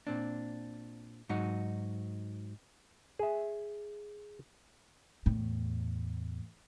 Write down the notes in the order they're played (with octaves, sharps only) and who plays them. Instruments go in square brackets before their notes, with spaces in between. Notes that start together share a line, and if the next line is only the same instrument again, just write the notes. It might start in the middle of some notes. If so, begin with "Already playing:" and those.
[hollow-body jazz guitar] A#2 C4 D4
G#2 F#3 D#4 F#4
[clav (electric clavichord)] G#4 E5
[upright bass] E2 A2